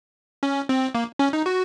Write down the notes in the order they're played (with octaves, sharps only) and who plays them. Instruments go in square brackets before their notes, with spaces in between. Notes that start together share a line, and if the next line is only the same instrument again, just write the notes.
[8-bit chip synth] C#4
C4
A#3
C#4
D#4
F#4